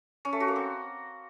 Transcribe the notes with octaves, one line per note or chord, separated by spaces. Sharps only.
C#4
A3
F#4
A#3
C4